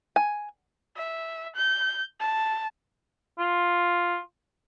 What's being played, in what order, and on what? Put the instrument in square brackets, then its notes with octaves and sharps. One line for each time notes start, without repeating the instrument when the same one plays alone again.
[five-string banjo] G#5
[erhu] E5
G6
A5
[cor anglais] F4